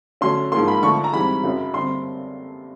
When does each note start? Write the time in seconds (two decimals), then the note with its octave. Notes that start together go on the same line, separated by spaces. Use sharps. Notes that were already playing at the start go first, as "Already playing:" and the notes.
0.21 D3 F#3 A3 C#4 C6
0.52 G#2 F3 A#3 C6
0.68 B5
0.83 D3 F3 A3 C#6
1.04 A#5
1.13 G#2 E3 G3 C4 B5
1.43 F#2 C#3 F#3
1.74 G2 D3 G3 C4 C6